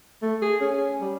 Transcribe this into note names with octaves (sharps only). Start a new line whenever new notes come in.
A3
G#4
C#4
G3